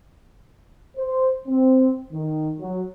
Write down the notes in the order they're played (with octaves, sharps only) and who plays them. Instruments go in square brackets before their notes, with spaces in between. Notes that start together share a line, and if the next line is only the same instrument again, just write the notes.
[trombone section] C5
C4
D#3
F#3